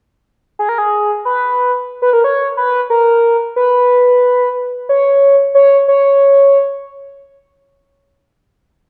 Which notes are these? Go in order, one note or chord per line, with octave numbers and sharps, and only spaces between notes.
G#4
A#4
G#4
B4
B4
A#4
C#5
B4
A#4
B4
C#5
C#5
C#5